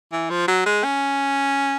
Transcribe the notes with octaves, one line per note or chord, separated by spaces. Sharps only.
E3
F3
F#3
G#3
C#4